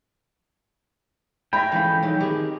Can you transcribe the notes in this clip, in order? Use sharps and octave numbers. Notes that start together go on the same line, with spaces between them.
C#5 E5 G5 G#5 B5 A#6
E3 F3 G#3 A3 C#4
F#3 D#4 B4
D#3 C4 G4 G#4